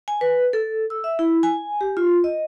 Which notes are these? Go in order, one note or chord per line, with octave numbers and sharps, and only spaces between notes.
G#5
B4
A4
E6
E5
E4
G#5
G4
F4
D#5